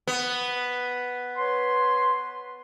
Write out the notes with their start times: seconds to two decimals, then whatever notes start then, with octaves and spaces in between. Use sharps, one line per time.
0.07 B3
1.37 B4 C#5 C6